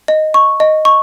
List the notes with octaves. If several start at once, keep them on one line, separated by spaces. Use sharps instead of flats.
D#5
C#6
D#5
C#6